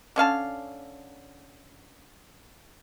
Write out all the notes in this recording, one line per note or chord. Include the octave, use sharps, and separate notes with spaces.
D3 C#4 F5 A5